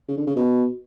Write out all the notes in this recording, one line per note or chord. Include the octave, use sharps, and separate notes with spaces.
C#3
D3
C#3
B2